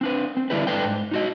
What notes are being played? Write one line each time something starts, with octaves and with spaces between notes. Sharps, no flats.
C4 D4 B4
C4
D3 G3 D4 E4 G4 B4
G#2 D4 A4 B4 G5
G#2
D#4 F#4 D#5